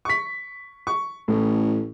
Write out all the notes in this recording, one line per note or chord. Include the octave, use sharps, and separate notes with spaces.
C#6 B6
C#6
A1 A2